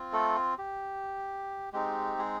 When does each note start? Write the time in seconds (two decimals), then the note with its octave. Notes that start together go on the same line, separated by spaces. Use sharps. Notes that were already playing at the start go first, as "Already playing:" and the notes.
Already playing: C4 F4
0.13 A3 A4
0.58 G4
1.73 G#3 C4 D#4 G4
2.18 G#3 G#4